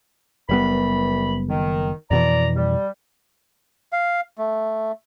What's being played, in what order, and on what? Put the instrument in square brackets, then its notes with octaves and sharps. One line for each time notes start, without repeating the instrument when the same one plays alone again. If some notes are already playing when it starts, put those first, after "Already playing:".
[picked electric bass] F#1 G3 B3 [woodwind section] C2 E3 B5
[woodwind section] D#3
[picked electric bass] F2 B2 E3 [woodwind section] D5 A#5
[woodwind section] G3
[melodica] F5
A3